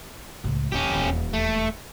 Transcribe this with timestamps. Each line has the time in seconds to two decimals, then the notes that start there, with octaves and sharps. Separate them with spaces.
0.44 C#2 A2
0.72 D#1 C#4 G4
0.91 D#1 E2
1.33 A3